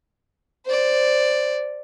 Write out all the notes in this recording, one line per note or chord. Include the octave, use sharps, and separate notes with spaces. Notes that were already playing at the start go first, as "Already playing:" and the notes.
C5 D5